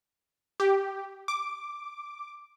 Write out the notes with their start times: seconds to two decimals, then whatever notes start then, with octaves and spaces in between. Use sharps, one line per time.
0.60 G4
1.28 D6